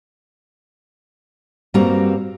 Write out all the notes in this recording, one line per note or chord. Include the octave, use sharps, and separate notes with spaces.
G2 G3 A#3 C4 F#4 A#5